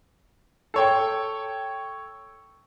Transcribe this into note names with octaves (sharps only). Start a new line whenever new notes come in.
A4 C#5 G5